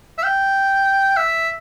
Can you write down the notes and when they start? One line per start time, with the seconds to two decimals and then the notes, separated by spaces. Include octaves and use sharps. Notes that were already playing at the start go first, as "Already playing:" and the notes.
0.18 E5
0.23 G5
1.17 E5